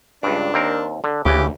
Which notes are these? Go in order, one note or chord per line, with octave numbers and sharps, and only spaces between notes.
C#2 G2 D4
D#2 C4 A#4
D3
D2 C#3 E3 G4